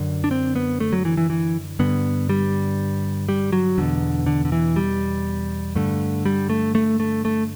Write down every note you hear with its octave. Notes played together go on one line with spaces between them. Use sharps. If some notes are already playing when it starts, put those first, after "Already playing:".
Already playing: F#2 D3
D4
C4
B3
A3
F#3
E3
E3
E3
G2 D3 B3
G3
G3
F#3
E2 B2 D3
D3
D3
E3
G3
G2 D3 A3
G3
A3
A3
A3
A3